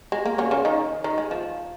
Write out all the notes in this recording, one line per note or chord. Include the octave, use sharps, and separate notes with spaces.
G#3
A#3
C#3 C#4
C#3 C#4
D#3 D#4
D#3 D#4
G#3
F3